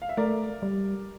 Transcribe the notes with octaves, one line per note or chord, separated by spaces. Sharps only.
F5
E5
A3 A#4 D5
G3